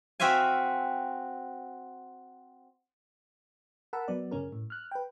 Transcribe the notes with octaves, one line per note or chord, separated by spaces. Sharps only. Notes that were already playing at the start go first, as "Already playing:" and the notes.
C4 F#4 E5 F5 G#5
A#4 F#5 A5 B5 E6
F#3 B3 D5
F#2 C#3 C#4 A#4
A2
F6 F#6
B4 G5